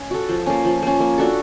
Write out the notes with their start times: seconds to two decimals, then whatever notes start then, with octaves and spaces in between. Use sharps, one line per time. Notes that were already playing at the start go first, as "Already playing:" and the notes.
Already playing: C#4
0.11 F#4 A4
0.29 F3
0.46 A#3 C#4
0.65 F3
0.82 A#3 C#4
1.00 A#3
1.18 D4 F#4 A4